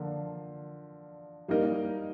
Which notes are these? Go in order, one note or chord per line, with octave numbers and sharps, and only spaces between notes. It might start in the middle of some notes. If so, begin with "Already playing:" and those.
Already playing: D3 F3 A#3 F4
G3 A#3 D#4 A#4 D#5